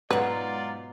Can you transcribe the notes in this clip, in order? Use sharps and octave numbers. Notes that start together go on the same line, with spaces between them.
G#2 B2 F#3 F4 B4 D5 A#5